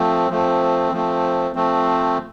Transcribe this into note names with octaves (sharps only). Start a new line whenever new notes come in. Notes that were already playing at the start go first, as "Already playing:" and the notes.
Already playing: F3 A3 C4
F3 A3 C4
F3 A3 C4
F3 A3 C4